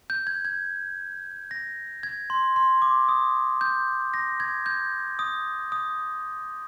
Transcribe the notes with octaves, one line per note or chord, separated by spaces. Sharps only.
G6
G#6
G#6
A#6
G#6
C6
C6
D6
D#6
G6
A#6
G#6
G6
D#6
D#6